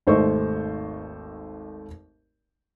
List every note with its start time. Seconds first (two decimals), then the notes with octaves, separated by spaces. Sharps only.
0.07 G#1 D#2 A3 C5 D#5 C#6